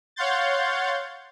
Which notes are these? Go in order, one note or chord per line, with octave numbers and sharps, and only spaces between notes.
C#5 F5 F#5 C6 G6 A6